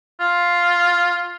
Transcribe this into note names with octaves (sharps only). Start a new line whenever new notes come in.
F4